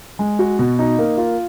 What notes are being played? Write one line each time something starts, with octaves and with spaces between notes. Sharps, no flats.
G#3
F#4
B2
D#4
A#3
F4